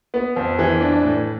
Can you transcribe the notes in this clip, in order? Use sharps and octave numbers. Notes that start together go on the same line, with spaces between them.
B3
F2
E3
D4
A2